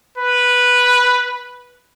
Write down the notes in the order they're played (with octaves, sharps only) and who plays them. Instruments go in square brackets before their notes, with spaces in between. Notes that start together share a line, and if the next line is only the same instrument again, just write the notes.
[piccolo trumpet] B4